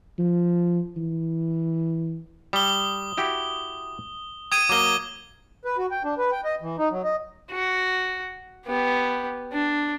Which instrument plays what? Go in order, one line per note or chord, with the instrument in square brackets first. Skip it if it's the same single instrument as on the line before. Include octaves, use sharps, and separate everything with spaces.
[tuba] F3
E3
[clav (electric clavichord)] G3 [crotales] D#6 G7
[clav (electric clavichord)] E4 F#4 G4
[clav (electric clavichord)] G5 [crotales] D#6 G#6 D#7
[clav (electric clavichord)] F#3 A#3 [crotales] D6 G7
[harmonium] B4
F#4
G5
D4
B4
G5
D#5
E3
D#4
F#3
D#5
[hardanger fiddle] F#4
B3 G4
D4